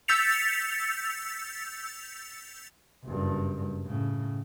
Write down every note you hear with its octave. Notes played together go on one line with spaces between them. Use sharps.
E6 G6 A6 B6 C#7 F7
F#1 G2
A2 C#3